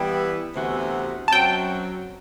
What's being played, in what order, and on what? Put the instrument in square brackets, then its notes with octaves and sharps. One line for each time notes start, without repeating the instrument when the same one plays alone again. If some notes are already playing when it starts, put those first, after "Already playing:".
Already playing: [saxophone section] E3 G3 B3 E4 [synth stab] G5
[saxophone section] D2 C3 E3 B3 F#4
[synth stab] A5
[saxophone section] F#2 F#3 C4 F#4 [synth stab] G5